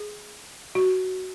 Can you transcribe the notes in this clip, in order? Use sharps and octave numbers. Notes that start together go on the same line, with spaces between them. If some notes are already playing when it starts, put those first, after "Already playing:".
Already playing: G#4
F#4